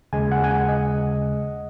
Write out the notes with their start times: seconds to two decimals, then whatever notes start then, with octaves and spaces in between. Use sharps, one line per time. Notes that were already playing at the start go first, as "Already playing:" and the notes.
0.13 D#2 C#3 G#3 G#5
0.32 F#5
0.44 G#5
0.50 F#5
0.69 D#5